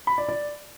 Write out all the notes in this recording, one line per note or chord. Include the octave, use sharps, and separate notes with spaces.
B5
D5
D5